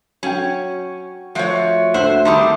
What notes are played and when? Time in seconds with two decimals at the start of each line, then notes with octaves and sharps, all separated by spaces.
0.23 F#3 C#4 G5
1.35 F3 A3 F#4 C#5
1.94 D2 C5 E5 F#5
2.25 D#3 G3 C4 A5 C6 D#6